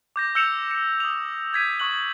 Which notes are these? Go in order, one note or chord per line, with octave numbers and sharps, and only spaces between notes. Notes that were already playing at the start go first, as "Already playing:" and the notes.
D6 G6 A#6
E6 G6 C#7 E7 F7
C#7
D#6 F7
G6 G#6 B6 D#7
C#6 D#6 F#6 F#7